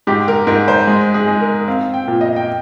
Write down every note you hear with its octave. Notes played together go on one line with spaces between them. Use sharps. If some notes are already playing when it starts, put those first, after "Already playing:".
G#2 G4
A#4
G#2 A#4
C5
G#3
G#4
G#3
A#4
C4 F5
G5
A#2
D#5
G5